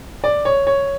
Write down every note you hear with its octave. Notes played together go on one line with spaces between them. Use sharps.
D5
C#5
C#5